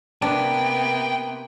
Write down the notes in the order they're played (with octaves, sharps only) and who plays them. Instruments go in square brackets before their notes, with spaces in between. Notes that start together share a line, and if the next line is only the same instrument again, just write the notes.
[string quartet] C3 A#3 B3 [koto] D4 [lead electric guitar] G5